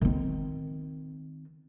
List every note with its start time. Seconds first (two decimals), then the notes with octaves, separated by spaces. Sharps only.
0.01 D#3 C4